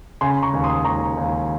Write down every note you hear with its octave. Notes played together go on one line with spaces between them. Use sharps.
C#3 G#5 C6
A#5 C#6
D#2
C6 D#6
D#2 A#5 C#6
D#2